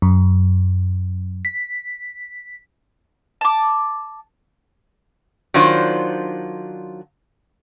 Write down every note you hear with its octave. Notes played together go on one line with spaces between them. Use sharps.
F#2
B6
A5 D6
D#3 F#3 D4 F4 C5